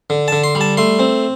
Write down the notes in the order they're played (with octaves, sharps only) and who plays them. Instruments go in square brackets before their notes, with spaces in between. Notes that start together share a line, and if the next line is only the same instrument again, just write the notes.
[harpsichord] D3
D3 A5
C6
G3
A5
A3 C6
C4